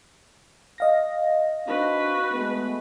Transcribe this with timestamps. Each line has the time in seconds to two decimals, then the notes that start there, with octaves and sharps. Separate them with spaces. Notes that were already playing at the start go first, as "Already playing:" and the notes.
0.78 D#5 F5 A#6
1.67 C4 D4 D#4 F#4 B4
2.31 G#3 A3 B3